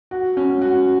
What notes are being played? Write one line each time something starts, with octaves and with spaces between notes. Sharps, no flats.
F#4
C#4
F#4